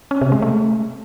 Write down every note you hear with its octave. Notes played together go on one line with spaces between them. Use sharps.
C#4
C3
G#3
A3